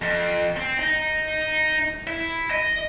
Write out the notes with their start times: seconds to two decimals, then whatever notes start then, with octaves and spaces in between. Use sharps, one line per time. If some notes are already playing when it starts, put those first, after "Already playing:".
0.02 F2
0.56 C4
0.79 D#4
2.07 E4
2.51 D#5